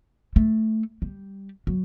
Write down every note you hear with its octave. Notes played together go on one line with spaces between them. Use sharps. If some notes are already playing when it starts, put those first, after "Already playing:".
A3
G3
F#3